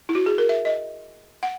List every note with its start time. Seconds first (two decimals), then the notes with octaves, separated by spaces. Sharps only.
0.09 E4
0.15 F#4
0.26 G#4
0.38 A#4
0.49 E5
0.65 D#5
1.43 F#5